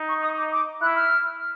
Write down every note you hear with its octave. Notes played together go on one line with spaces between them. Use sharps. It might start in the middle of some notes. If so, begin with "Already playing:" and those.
Already playing: D#4
C#6
D#6
D6
D6
E4 F#6
F6